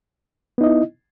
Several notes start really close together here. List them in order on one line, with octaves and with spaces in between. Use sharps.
B3 D#4 D#5 E4